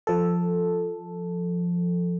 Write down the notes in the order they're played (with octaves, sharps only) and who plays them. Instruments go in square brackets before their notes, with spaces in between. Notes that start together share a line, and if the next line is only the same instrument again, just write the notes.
[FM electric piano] F3 A4